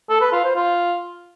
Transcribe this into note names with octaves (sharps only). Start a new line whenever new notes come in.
A4
B4
F4
C5
F4